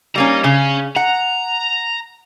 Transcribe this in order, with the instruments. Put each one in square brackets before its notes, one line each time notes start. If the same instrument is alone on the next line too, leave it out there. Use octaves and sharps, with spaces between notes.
[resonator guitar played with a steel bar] G3 A#3 C#4 [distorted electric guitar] D#5 A#5
[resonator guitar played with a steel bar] C#3 [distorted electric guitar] C#4
[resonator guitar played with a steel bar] F#5 [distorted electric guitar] A#5